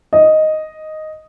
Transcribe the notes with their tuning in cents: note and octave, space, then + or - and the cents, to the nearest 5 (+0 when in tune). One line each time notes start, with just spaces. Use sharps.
D#5 +0